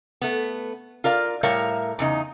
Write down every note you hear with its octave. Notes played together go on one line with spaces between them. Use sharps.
A3 B3
F4 A#4 D5 F5
A2 G3 A#4 C#5 E5 F5
E2 C#3 D#4